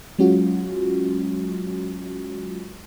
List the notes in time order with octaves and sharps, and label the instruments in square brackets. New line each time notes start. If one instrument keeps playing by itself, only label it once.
[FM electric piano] F#3 G#3 C#4 F4 F#4